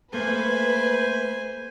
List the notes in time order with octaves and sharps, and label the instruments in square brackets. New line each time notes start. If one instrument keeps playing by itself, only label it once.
[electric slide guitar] A3 A#3 A4 [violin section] B4 [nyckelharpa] C5 G#5